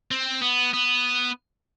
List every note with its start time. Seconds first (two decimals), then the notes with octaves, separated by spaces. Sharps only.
0.11 C4
0.42 B3
0.74 B3